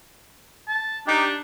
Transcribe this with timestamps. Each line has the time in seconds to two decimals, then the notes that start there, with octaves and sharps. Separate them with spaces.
0.68 A5
1.07 D4 D#4 G4